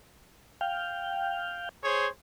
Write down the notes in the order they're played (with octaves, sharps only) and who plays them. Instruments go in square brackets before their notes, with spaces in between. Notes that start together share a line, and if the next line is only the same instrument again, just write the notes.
[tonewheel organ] F5 G5
[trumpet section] G#4 C5 C#5